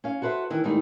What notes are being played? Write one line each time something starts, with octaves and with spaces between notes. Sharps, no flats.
C#4 F5
F#4 A4 B4 C5 E5
D#3 E3
G#2 D#3 G3 A3 C4 D#4